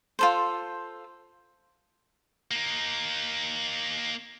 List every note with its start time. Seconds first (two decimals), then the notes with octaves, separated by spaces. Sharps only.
0.19 F4 A4 C5
2.51 A#3 D#4